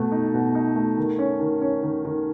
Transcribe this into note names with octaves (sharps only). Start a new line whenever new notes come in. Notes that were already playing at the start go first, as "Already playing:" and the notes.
Already playing: B2 A3
D#4
B2
D#4
A3
D#3
C#4
D#3
C#4
D#3
D#3